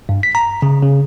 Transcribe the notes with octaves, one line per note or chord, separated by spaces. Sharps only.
G2
B6
A#5
C#3
C#3